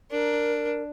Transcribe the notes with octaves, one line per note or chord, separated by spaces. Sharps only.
D4 A#4